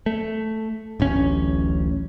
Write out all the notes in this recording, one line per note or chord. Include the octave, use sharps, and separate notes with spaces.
A3
D1 A1 C#4